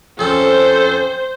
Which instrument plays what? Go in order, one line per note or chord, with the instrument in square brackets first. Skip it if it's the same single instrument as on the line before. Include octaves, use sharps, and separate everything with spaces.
[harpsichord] F2 C#4 [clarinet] A4 [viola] C5